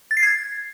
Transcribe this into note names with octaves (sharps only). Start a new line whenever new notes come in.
A6
C7
G#6